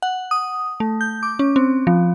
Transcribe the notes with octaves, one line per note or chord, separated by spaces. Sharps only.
F#5
D#6
A3
G6
D6
C#4
C4
F3